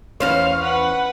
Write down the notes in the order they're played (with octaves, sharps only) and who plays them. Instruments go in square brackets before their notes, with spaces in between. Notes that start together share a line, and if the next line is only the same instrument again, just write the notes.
[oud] E2 C#4 C5 [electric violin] F5
[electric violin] B4 F#5